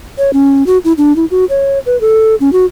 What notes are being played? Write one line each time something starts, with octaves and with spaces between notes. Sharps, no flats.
C#5
C#4
F#4
E4
D4
E4
F#4
C#5
B4
A4
C#4
F#4